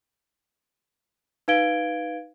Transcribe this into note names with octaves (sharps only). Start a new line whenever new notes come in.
D#4 B4 F5 G#6 D7 G7